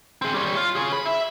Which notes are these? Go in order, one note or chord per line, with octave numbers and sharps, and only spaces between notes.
C4 G#4
G3 C#5
F4
G#4 C#5
B5
E5